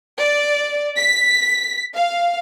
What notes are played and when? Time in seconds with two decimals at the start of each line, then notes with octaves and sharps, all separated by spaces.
0.20 D5
0.97 B6
1.95 F5